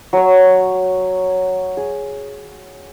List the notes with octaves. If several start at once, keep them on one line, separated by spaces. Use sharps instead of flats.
F#3 C#5
G#4